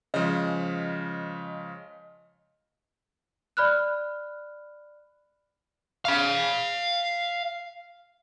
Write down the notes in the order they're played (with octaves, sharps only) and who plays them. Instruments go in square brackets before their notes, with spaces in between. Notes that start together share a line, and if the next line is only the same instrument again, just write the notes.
[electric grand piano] C#3 F3 G#3 [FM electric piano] D#5
[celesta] D5 B5 F6 F#6
[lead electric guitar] F5 B5